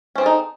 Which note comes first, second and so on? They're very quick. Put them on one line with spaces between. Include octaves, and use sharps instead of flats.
C#4 C4 G#4 A4 D#4